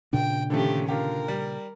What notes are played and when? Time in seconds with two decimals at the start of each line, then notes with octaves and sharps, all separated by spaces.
0.13 A#2 C#3 D4 G5
0.50 D3 D#3 F3 A3 C#4 G4
0.89 D3 F4 G4 A#4
1.28 G3